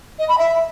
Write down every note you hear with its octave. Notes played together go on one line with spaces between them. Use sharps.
D#5
B5
E5